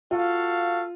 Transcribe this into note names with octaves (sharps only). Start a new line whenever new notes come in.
F4 F#4 A4 F5